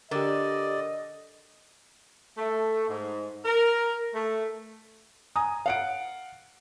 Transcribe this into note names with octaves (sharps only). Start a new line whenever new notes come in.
D3 G4 A#4 D5 D#5
A3
G#2
A#4
A3
G#5 A#5 D#6
F5 F#5 D7